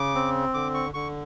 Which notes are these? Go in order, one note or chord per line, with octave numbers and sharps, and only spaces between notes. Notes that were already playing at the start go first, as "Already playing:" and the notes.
Already playing: C#3 D6
C4
D3 D6
C#6
D3 C#6